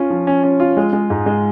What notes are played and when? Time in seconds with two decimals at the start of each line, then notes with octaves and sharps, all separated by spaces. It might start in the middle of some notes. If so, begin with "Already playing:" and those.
Already playing: C#4 F4
0.10 F3
0.27 C#4
0.43 C#4
0.60 F4
0.77 G#3
0.93 G#3
1.10 G#2
1.26 G#3